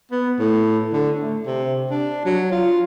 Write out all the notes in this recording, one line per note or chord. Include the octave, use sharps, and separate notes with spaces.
B3
A2
D3
A3
C3
D4
F#3
F4